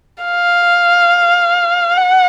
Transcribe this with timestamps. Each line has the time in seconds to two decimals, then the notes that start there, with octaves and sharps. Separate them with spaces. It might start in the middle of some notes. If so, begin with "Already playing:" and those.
0.24 F5
1.98 F#5